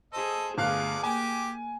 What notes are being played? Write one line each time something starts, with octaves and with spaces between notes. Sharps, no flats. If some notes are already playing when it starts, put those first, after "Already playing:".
G#4 A4 C5 D#5
G1 F3 A3 G#4 F5 D6 F#6
A#3 G4 G#5 D6